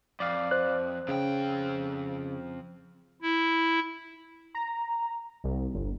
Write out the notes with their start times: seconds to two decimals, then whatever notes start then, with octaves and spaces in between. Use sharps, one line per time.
0.20 F2 D5 F5
0.51 C5 F#6
1.08 F2 C#3 G5
3.22 E4
4.54 A#5
5.44 C2
5.75 G1